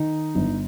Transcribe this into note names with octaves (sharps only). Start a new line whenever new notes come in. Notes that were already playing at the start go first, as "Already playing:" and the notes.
Already playing: D#3 D#4
G1